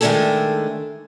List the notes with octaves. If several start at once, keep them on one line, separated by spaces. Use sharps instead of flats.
D#3 G#3 A3 D4 G#4 A4